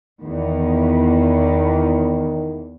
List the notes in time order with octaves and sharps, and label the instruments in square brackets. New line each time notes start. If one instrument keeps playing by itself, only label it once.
[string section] E2 [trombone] D#3